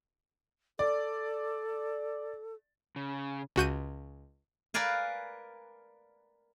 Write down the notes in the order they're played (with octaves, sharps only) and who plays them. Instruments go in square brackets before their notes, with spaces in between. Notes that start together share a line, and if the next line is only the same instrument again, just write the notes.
[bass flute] A4 [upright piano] D5
[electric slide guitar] C#3
[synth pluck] C#2 F#4 G6 D#7
[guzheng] A#4 B4 D5 F5 G#5